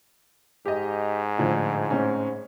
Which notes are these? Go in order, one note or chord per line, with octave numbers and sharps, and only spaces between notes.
G#2 G4 D#5
A2 D3 F3
A2 C4 C#4